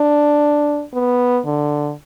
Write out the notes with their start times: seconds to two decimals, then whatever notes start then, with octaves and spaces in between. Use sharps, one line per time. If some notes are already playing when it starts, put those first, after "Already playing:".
Already playing: D4
0.93 B3
1.45 D3